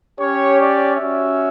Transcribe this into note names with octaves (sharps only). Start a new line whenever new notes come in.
C#4 G4 C#5
D5
C#4 F#4 E5